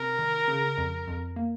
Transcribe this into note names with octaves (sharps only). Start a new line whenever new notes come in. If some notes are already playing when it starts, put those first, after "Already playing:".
Already playing: C3 A#4
D#3
C#3
F2
F2
A#3